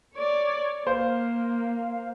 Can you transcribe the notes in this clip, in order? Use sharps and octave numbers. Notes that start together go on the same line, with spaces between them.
C#5 D5
A#3 C5 F5